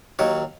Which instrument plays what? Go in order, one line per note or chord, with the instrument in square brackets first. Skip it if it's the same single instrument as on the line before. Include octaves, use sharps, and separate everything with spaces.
[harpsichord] D#2 D#3 F#3 C#5